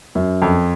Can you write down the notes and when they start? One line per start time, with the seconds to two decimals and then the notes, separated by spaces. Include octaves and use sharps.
0.15 F#2
0.42 F2